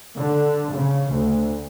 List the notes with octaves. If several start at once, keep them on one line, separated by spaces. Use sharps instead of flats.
D3
C#3
D2